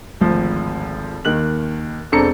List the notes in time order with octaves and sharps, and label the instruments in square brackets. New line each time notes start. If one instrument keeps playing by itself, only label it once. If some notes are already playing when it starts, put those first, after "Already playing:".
[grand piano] G#1 D2 F3
D#2 D#3 F#6 F#7
E1 C4 D4 A4 A#5 C#7